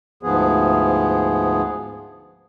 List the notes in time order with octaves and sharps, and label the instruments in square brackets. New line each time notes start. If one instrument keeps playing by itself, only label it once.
[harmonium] D2 G#2 F3 B3 G#4